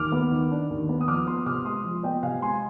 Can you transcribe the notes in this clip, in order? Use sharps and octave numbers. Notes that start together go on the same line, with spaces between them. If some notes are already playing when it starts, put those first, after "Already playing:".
Already playing: D#2 D6 F6
B3
D#3
D4
D#2
B3
D#6
F3 D6 F6
B3 C6 D#6
C3 D6 F6
G#3 C6 D#6
F3
B3 D#5 G5
C3 F5 G#5
G#3 G#5 C6